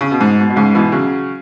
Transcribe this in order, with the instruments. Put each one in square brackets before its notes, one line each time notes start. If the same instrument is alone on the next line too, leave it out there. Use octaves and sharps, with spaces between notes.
[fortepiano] C#3
B2
G#2
B2
B2
G#2 C#3
B2 E3
C#3 F#3